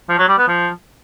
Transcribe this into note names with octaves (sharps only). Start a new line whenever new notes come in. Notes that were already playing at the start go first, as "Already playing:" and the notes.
F3
F#3
G3
B3
F3